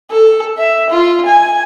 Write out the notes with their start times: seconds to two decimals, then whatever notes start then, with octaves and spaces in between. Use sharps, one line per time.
0.11 A4
0.58 E5
0.90 F4
1.26 G#5